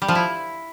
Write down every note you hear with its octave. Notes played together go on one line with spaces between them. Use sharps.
G3
F3
E4